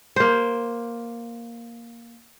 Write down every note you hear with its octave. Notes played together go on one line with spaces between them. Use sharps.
A#3 C5